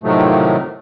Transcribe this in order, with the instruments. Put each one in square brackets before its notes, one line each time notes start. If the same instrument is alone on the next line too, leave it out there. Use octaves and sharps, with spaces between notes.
[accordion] A2 C3 D#3 F3 F#3 A3